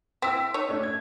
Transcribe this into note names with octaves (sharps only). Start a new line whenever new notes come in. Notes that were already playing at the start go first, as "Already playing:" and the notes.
C4 E4 E6 B6
D#4 C#5
A3 C#4 D4
G#6